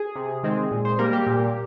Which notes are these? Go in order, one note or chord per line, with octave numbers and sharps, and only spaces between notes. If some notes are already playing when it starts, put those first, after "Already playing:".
Already playing: G#4
C3
D#3 G#3 C4
A#2
C5
G3 A#3 A#4
G4
A#2